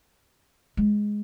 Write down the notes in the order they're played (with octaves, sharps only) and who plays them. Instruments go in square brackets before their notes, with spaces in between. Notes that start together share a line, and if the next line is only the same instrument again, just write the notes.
[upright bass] G#3